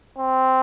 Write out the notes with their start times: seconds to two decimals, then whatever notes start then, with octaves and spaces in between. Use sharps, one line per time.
0.18 C4